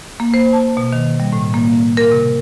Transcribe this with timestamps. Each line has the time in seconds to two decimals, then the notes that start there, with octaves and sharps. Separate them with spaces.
0.20 A#3
0.34 C5
0.53 A5
0.77 B2
0.93 D#3
1.20 G3
1.33 A2
1.54 A#3
1.97 A#4
2.12 C3